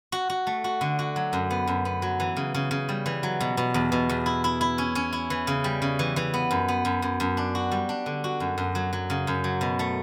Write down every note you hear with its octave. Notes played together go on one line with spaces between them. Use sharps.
F#4
F#4
A3
F#4
D3
F#4
F#3
F#2
B3
F#2
B3
F#3
E3
C#3
C#3
C#3
G3
E3
F#3
B2
B2
E2
B2
E2
E4
E4
E4
C#4
C#4
E4
E3
C#3
G3
C#3
E3
E3
B3
F#2
B3
F#2
F#2
F#2
D4
F#4
G3
D4
D3
F#4
F#2
F#2
F#3
F#3
C#3
F#2
F#3
B2
A3